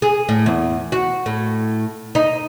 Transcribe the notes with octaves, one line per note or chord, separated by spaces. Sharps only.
G#4
A2
E2
F#4
A2
D#4